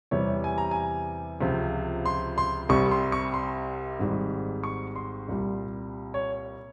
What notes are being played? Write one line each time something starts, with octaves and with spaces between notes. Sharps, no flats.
E2 C3 E3 G3 C#5
G#5
A#5
G#5
C#2 C3 F3
C6
C6
C2 C3 G3 C#6
C6
C#6
C6
G#1 G#2 G3
C#6
C6
C2 A#2 G3
C#5